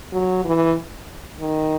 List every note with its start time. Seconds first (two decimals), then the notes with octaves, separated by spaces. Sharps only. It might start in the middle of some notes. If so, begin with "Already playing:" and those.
0.13 F#3
0.45 E3
1.40 D#3